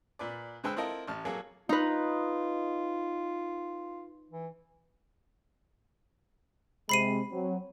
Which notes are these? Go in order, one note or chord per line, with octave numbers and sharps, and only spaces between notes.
A#2 B4 D5
D3 G#3 B4 C5 G5 E6
C4 E4 F4 A4 A#4 D#5
A1 A5 F6
F#3 A#3 G#4 A4
D#4 F4 B4
E3
C3 G#3 B5 C7 D#7
F#3 C4